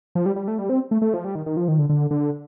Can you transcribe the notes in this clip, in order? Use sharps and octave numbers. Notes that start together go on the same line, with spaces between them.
F3
G3
G3
A3
G3
C4
A3
A3
F3
G3
D#3
D#3
F3
D#3
D3
D3
D3